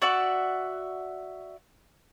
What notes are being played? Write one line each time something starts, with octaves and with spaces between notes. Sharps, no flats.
F#4 D5 E5 F#5